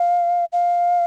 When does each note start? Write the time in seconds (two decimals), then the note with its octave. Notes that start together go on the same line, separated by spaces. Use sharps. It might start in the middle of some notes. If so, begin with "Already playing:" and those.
Already playing: F5
0.53 F5